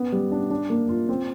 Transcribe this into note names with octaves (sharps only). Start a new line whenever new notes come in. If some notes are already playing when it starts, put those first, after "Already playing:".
Already playing: B3
G3
D4
D4
A#3
F4
C4